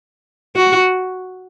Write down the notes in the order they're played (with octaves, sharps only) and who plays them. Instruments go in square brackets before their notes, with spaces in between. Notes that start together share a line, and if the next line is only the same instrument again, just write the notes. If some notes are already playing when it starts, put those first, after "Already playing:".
[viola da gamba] F#4